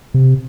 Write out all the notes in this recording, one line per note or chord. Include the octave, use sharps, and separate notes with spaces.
C3